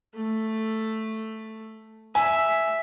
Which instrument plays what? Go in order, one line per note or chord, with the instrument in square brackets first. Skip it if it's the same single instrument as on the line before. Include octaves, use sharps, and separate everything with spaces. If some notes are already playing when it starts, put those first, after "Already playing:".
[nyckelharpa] A3
[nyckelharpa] E5 [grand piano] G#5